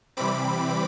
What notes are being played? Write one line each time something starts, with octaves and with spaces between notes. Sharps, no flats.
C3 E3 G3 C4 B5 D6